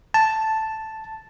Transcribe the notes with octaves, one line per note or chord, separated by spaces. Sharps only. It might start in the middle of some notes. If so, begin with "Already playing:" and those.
A5